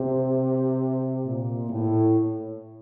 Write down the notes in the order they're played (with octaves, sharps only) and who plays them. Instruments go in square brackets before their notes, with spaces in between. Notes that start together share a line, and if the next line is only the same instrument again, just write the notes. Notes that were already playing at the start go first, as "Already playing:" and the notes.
Already playing: [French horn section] C3
A#2
A2